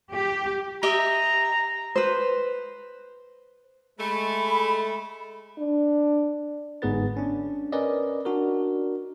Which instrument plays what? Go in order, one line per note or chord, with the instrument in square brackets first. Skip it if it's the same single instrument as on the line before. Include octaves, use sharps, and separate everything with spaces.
[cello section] G4
[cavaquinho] G4 D#5 E5 [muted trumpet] A#5
[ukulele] B4 C5
[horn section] G#3 A3 [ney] B5
[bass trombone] D4
[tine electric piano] G1 G#2 B3 G#4 B4 A6
C#4 D4
C#4 A#4 B4 D5 D#5
D4 F#4 A#4